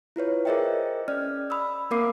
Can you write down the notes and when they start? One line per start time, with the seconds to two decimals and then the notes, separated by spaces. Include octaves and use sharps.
0.16 E4 F4 B4 C#5
0.45 G#4 A#4 C5 D#5 E5 G5
1.08 C#4 D5 F6
1.50 B5 D#6 E6
1.91 A#3 C4 A#4 F5 D6 C7